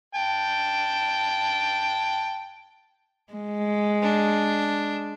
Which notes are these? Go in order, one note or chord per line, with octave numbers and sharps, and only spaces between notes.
G5 A5
G#3
D4